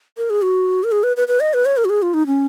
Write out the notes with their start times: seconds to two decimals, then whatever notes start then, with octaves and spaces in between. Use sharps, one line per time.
0.17 A#4
0.30 G#4
0.42 F#4
0.84 A#4
0.92 G#4
1.03 B4
1.17 B4
1.28 B4
1.40 D#5
1.54 B4
1.65 C#5
1.77 A#4
1.85 F#4
1.90 G#4
2.02 F4
2.14 D#4
2.27 C#4